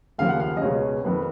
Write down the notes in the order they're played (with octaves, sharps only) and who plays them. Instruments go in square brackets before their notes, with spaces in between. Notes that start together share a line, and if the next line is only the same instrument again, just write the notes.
[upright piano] D#2 C#3 F3 A#3 F5
F#5
F5
D#5
C#2 B2 G#3 C#5
F2 D#3 A#3 B4